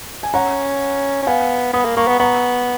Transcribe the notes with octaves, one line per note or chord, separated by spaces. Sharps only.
G#5
C#4 F#5 A#5
C#4
B3 F5 G#5
B3 B5 D#6
A#3
A#3 A#5 C#6
B3
B3 A#5 C#6